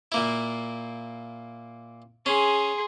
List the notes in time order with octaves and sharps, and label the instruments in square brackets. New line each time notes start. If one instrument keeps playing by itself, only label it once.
[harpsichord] A#2 A#3 E4
[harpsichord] C#4 [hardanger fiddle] G#4 C6